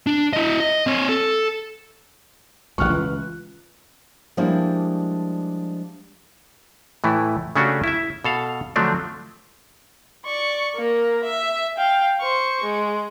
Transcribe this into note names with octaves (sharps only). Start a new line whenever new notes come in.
D4
E4 D#5
D#5
C4 C#5
A4
A1 D2 G2 C#6 F6 F#6
C#2 E3
F3 G3 G#3 A#3 D4 E4
A2 E3 A3 E4
C#3 A3 C#4 D4 F#4 G4
E4 E5
B2 A4 F5
D3 F3 F#3 A3 C4 D4
D5 C#6
A#3 A#4
E5
F5 G5
C5 C#6
G#3